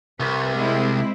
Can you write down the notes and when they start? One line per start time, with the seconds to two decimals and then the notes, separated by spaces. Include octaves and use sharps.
0.20 C2 B4
0.54 G#3 C4 E4